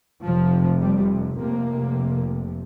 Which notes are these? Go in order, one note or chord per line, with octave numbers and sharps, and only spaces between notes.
F1 F2 C3 F3
G3
F1 F2 C3 A#3